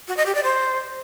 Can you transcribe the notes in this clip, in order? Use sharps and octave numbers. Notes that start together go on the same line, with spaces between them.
F#4
D#5
G4
D5
C5